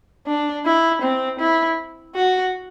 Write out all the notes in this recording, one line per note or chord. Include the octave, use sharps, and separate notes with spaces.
D4
E4
C4
E4
F#4